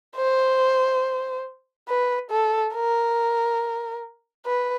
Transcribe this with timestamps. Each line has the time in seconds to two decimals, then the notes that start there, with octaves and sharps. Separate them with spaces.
0.16 C5
1.89 B4
2.31 A4
2.74 A#4
4.46 B4